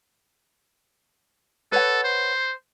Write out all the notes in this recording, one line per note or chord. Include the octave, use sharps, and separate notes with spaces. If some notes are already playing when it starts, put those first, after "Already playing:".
A4 B4 C#5 F#5
C5